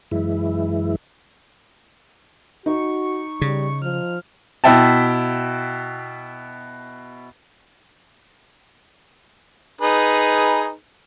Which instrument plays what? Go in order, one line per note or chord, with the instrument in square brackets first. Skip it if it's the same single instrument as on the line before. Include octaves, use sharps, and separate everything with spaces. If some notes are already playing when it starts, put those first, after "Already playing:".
[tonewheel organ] F#2 E3 G#3 E4
[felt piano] D#4 [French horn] F#4 [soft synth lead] C#6
[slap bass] C#3 [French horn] G3
[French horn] F3 [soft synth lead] F6
[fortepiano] B2 E4 E5 G5 A5
[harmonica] D#4 G#4 B4